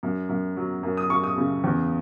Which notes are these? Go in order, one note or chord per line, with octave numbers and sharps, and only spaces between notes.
F#2
F#2
F#3
F#2
D#6
F#2 C#6
D#6
C#3
E2